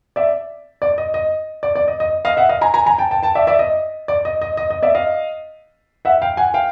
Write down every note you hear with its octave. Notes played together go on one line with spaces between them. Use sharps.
D5 E5
D5
D#5
D#5
D5
D5
D#5
D#5
D#5 F5
E5 F#5
D#5 F5
G#5 A#5
G#5 A#5
G#5 A#5
G5 A5
G5 A5
G5 A5
D5 E5
D5 E5
D#5
D5
D#5
D#5
D#5
D#5
D5 E5
D#5 F5
E5 F#5
F5 G5
F#5 G#5
F5 G5